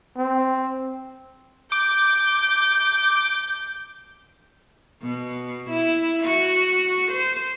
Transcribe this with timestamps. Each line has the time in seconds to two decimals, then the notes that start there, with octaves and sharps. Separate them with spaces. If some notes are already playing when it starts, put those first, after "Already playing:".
0.16 C4
1.72 D6 G6
5.02 B2
5.70 E4
6.24 F#4
7.11 C5